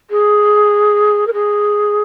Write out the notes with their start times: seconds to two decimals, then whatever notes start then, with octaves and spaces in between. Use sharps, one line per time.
0.10 G#4
1.27 A#4
1.33 G#4